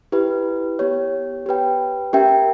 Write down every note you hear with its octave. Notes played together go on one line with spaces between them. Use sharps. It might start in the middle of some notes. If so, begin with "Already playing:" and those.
E4 G4 B4
B3 G4 C#5
G4 B4 G5
C#4 G4 A#4 E5 G5